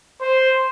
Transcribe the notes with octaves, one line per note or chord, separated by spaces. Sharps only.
C5